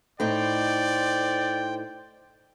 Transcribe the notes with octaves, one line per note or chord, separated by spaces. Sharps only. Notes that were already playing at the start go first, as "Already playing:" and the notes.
A2 D#4 C5 D5 G5